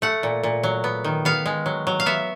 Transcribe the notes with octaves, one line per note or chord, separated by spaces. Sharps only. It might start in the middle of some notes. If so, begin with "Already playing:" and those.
A3 F#5
A#2
A#2
F#3
B3
D#3
B3 F5
G#3
F#3
F#3
F5
B3 E5